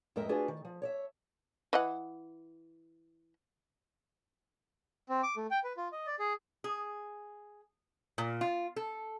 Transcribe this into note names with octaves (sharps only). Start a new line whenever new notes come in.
F2 A2 G#3 A#4 D#5 E5
D4 F4 F#4 G#4 B4 C5
D#3
F3
C#5 D5 E5
E3 D#5 F#5
C4
D6
A3
G5
B4
F4
D#5
D5
G#4
G#4
A#2
F4
A4